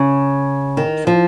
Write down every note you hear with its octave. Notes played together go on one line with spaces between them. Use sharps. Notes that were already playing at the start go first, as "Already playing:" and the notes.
Already playing: C#3
D#3
F3